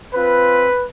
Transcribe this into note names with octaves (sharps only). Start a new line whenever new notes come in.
C4 F4 B4